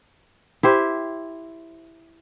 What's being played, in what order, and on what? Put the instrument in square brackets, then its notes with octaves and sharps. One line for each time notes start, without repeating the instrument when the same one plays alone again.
[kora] E4 G4 C5